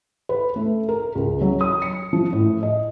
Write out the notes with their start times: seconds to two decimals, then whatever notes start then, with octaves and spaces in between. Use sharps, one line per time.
0.29 B4
0.56 A3
0.89 A#4
1.15 C#2
1.41 F#3
1.61 D#6
1.82 C#7
2.13 F3
2.33 A2
2.63 D#5